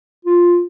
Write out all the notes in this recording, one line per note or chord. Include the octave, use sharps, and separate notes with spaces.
F4